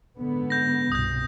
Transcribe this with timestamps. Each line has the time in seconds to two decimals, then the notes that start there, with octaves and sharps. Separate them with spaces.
0.18 G#2 D3 B3
0.50 G6 A#6
0.92 C2 G2 B2 D#6 G6